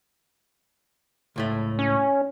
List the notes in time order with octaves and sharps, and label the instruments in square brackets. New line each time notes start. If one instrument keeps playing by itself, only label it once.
[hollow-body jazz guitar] C#2 A2 A3
[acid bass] C#4